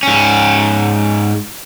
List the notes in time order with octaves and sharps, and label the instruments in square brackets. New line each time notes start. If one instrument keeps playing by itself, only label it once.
[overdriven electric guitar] G#2 C#4